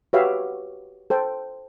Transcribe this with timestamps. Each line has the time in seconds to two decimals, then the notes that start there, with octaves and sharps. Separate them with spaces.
0.13 F#4 G4 B4 C#5 E5 F5
1.10 A4 C5 G5